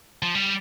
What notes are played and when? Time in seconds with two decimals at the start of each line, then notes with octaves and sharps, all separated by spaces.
0.23 F3
0.35 G3